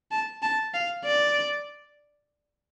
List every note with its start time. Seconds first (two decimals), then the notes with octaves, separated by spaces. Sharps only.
0.11 A5
0.42 A5
0.74 F5
1.05 D5